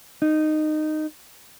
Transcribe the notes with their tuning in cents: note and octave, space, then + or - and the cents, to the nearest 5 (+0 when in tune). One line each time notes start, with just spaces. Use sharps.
D#4 -15